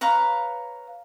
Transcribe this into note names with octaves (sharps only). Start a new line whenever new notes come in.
B4 C#5 F5 A#5